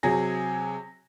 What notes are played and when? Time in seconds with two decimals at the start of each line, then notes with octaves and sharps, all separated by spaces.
0.03 C3 F#3 G#4 A#6